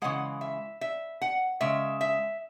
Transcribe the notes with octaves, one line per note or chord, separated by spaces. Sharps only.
C#3 E3 G#3 F#5
E5
E5
F#5
C#3 G#3 E5
E5